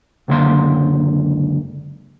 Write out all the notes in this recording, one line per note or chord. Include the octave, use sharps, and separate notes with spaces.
C#2 F#2 D3 A#3 C6